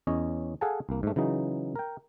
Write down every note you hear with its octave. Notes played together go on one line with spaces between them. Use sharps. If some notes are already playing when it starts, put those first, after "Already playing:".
E2 C#4 C#5 D#5
G#4 A4 F5 F#5 G#5 A5
C2 A#3
G#2 A3
C#3 E3 F#3 D#4
A#4 G5